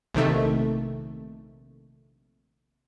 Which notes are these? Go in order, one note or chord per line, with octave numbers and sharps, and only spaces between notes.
A#1 C3 D#3 A3